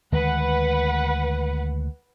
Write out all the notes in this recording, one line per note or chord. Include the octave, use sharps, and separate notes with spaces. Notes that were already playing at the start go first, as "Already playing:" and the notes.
D2 D#3 G#3 B4 F#5